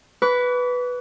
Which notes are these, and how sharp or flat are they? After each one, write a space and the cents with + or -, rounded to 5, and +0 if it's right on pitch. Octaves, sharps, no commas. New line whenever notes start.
B4 +0 D6 -45